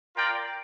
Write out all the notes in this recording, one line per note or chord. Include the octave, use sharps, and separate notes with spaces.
F4 A#4 D5 G5